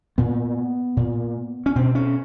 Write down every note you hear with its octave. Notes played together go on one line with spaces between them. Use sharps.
A#2 B3
A#2
C#4
B2 C4
C#4